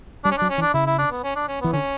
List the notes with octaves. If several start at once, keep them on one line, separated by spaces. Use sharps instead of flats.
G3 D4
C#4
F#3 D4
C#4
E3
D4
C#3 E4
E4
D4
B3
C#4
D4
C#4
E3 B3
D3 C#4